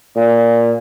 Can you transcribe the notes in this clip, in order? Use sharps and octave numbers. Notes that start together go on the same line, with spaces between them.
A#2